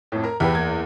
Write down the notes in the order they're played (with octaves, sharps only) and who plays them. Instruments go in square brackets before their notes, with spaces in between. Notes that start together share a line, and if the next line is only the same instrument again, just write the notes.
[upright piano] F2 A2
A#4 A#5
[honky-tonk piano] E2 [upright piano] E4 G4 B4
[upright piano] F#1 G#6